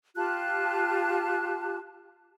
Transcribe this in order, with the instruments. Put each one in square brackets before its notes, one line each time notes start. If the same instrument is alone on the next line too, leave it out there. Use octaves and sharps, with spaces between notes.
[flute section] F4 G4 A5 F#6